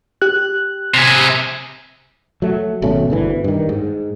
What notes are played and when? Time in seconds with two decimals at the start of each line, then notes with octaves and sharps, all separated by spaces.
0.21 G4 F#6
0.94 C3 G#4
2.42 F#3 A3
2.82 G#1 B2 A3 C#4
3.10 G1 D2 E3
3.44 G2 D#3
3.69 G#2